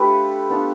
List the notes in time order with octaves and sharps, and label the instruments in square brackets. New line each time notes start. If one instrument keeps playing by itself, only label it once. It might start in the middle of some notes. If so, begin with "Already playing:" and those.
Already playing: [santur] A3 D4 F4 G4 A4 B4
B3 D4 F4